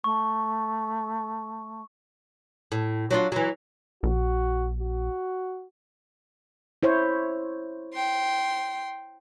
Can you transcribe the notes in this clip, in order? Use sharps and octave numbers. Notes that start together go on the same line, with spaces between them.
A3 C#6
A2
F#3 D4 F4
E3 F#3
A#1 F#4
F#4
E4 C5 C#5
G5 C6